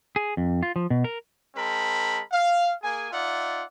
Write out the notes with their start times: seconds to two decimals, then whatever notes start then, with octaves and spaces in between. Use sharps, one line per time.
0.16 G#4
0.37 F2
0.63 F4
0.76 F3
0.90 B2
1.04 A#4
1.56 G#3 C4 A#4 A5 B5
2.32 F5
2.82 A#3 G#4 G#5
3.12 D#4 F4 D5 E5 F#5